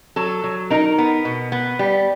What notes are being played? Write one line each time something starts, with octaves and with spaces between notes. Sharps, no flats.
F#3 A4
F#3
D#4 A#4
B3
B2
B3
G3